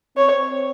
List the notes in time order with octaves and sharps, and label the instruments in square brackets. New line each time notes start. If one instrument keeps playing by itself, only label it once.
[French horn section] C4 [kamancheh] C#5